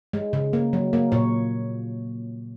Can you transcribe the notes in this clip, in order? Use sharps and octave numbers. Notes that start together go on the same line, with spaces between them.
G#3
C#3
A#3
F#3
A#3
A#2 C#5